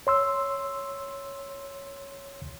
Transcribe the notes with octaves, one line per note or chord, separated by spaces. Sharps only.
C#5 C6 E6